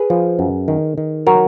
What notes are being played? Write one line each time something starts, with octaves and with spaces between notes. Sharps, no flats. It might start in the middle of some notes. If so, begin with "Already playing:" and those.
Already playing: G#4 B4
F3
F#2
D#3
D#3
F#3 F#4 A#4